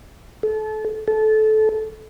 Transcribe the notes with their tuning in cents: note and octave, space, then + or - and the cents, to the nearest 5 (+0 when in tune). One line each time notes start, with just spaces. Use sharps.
A4 -30
A4 -20